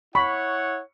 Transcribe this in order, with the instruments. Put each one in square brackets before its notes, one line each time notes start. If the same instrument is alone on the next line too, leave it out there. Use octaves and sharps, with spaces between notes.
[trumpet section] E4 C#5 F#5 [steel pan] B5 [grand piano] C#6